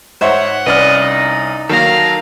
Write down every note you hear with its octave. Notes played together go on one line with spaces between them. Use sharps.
G#2 C5 C#5 E5 F#5
C2 C#4 B4 D5 D#5 F6
D#4
D#3 F#3 A#3 A4 F5 A#5